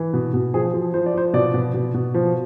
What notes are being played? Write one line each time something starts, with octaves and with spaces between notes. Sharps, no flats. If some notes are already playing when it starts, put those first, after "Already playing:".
Already playing: E3
B2
B2
F3 G#4
F3
F3 C5
D5
F3 C5
B2 D5
B2
B2
B2
F3